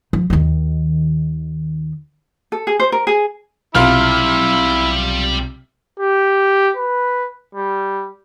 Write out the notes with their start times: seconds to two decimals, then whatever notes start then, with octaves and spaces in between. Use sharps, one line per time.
0.13 F3
0.30 D#2 D#3
2.52 A4
2.67 G#4
2.80 C5
2.92 A#4
3.07 G#4
3.75 B1 C3 G3 E4 F4 F6
6.00 G4
6.77 B4
7.55 G3